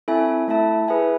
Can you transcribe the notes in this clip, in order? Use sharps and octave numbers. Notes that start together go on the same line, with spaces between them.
C4 E4 A4 E5 G#5
A3 E4 A4 E5 A5
E4 G#4 B4 E5 G#5